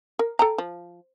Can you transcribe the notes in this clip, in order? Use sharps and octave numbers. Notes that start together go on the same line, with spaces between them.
A#4
A4 G5 A#5
F3